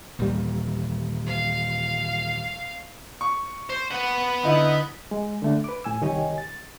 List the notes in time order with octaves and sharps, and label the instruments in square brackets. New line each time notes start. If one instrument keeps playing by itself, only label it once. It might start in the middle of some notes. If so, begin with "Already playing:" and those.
[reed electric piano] D#2 G3 [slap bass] A#2 D#3 E3
[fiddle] F5
[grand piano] C#6
[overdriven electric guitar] C5
B4 F#5
[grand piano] D3 D#4 E4
[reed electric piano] G#3
D3 A3 D4
B4 D6
A2 G#5 E6
C2 D#3 G4 C#5 D#5 G#5
A6